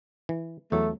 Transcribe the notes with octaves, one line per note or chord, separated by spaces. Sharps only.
E3
E2 F#3 A3